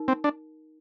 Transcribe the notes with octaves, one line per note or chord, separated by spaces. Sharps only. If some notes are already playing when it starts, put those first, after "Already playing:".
Already playing: D#4 A#4
C4
D4